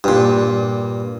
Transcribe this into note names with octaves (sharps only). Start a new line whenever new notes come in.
G2 A#2